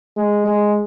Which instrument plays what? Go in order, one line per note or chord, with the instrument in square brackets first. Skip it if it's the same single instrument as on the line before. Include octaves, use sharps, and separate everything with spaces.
[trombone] G#3
G#3